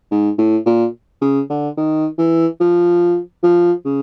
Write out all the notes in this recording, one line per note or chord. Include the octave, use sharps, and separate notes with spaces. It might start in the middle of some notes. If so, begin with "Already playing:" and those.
G#2
A2
A#2
C#3
D3
D#3
E3
F3
F3
C#3